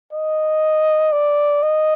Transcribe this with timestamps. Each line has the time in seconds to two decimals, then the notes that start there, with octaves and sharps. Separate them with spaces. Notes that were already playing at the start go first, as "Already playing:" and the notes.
0.13 D#5
1.12 D5
1.63 D#5